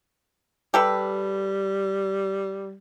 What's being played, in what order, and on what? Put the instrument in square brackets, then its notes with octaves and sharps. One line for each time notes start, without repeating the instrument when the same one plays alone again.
[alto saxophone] G3 [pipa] G4 A4 B4